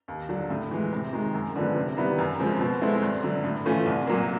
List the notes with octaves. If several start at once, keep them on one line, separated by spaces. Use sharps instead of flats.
D#2
D3 F#3
A2
E3 G#3
C3
D#3 G#3
F#2
D3 F3 G#3 B3
C3
D#3 G3 B3 E4
F#2
C#3 F3 G#3 C4
B2
G#3 C4 E4 A4
G2
D3 F#3
A2
E3 A3 C#4 F4
C2
A#2 F#3 A#3